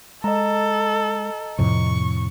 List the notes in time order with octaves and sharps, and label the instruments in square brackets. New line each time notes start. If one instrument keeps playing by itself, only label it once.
[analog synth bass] G#3 [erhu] A4 [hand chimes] D#5 A#5
[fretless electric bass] F2 C3 [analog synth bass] A2 [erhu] C#6